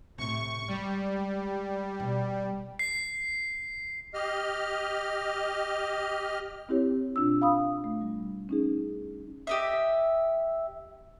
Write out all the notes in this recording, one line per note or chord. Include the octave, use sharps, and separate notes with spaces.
A2 C3 C#6
G3 G#3
B2
C7
G4 D#5 F6
C4 E4 G4 C#5
B2 D4 F4 E6
F5 B5 D#6
A3
G3
C#4 D#4 G#4
G4 D#5 E5